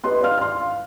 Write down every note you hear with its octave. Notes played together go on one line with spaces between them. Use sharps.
G4 B4 D#5 C6 F#6
D5 F5 F6
C6 F6
F5